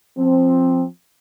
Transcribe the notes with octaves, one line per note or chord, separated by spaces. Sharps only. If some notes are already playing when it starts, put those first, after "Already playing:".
F3 C4